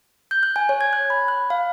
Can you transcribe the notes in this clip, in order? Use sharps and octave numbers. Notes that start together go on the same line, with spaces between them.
G6
F#6
G#5
C#5
G#6
F#6
B5
F#6
F5